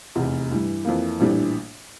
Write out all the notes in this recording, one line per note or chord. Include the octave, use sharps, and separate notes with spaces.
F1 E2 C3
G2 E3 G3
F2 E3 A#3
A#1 A2 E3 G3 D4